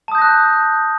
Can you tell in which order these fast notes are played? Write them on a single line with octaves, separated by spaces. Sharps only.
A5 D#6 G6 A#6 F#6